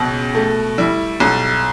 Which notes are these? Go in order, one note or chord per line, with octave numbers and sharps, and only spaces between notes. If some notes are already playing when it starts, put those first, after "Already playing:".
Already playing: C#2 B2
A3
G3 E4
B1